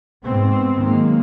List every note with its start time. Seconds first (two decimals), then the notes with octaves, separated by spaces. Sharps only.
0.24 G#2 B3 C4
0.80 D#3 F#3 G#3 A#3